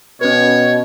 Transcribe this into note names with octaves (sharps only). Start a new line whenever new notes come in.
B2 C#4 B4 C#5